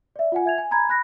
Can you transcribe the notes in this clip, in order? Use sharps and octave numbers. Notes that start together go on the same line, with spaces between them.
D5 E5
F4 F#5 G#5
E5 G#6 F7
G#5
G#5 A#5 B5 G#6
B5 F#6 A#6